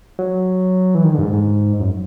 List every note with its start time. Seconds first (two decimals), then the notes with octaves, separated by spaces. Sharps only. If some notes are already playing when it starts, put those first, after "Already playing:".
0.19 F#3
0.95 E3
1.04 D#3
1.14 D3
1.18 G2
1.22 G#2
1.33 G#2
1.80 F#2